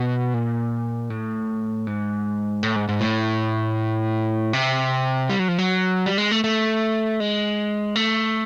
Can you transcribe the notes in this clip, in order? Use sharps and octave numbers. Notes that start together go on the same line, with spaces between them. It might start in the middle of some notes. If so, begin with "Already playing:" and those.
Already playing: B2
A#2
A2
G#2
A2
G#2
G#2
A2
C3
G3
F#3
F3
F#3
G3
G#3
A3
A3
G#3
A3